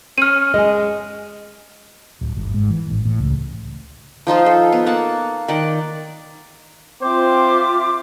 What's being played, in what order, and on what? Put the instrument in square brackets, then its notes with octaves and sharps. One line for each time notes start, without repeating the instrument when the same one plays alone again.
[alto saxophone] C#4 [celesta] F6 D#7
[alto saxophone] G#3 [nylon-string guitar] D#5 G#5
[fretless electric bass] D1
G1
G#2
E3
A1
A2
C#2
[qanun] F3 D#4 F4 C5
A4
B3
A#3 F#5 A5
D#3 D5 F#5
[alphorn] C4 [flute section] F4 E5 D6 [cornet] C5